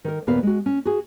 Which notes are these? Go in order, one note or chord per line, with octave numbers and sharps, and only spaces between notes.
D#3 A#4
D#2 A#2 B3 A#4 B4 F5
G#3 F#4
C#4
F#4 G#4